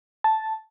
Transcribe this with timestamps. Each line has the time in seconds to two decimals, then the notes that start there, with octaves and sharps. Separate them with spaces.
0.24 A5